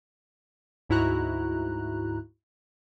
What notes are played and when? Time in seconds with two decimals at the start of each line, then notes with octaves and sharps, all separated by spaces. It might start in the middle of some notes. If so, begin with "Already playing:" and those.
0.89 D2 G#2 E4 F#4 A#5 F#6